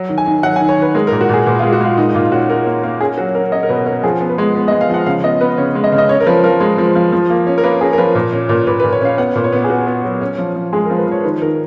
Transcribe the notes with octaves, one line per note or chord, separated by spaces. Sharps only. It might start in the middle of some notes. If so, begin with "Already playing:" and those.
Already playing: F#3
D#3
G#5
D#3
F#3 F#5
G#5
D#3
C#5
D#3 B4
G#3 A#4
A#4
A#2
F#4
A#2 G#4
A#2 B4
F4
G#3
F#4
G#3 F4
A#2 D#4
D#4
A#2 F4
F4
C#4 F#4
C#4 A#4
A#3
A#3
C#4 G#4
F#3 F#4
C#4 A#4
C#4 D#5
A#4
B2 B4
C#4 A#4
F3 G#4
B3
B4
G#3
B3
D#5
G#3
F5
F3 F#5
C#3 F5
B3 D#5
B3 B4
C#3 C#5
G#3
D#5
C#3
D#5
C#4 C#5
A#4
F3 B4
F3 A#4
G#3
F3
F3
F3
A#3
C#4
A#4
A#3 B4
C#4 G#4
A#4
F3 B4
A#2
C#4
A#2
A#2 B4
B4
A#2
C#5
C#4 F5
B3 F#5
A#2
C#5
B3
G#4
B3 F#4
B3
F#3
C#4
F3
F3
G#3 G#4
A#4
F3
B4
F3 C#5
D#3 B4
D#3 A#4